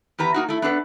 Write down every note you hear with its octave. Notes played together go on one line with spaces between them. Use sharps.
E2 G4 B4 A#5
A#3 D#4 F#4
A3 E4
B3 D4 A4 B4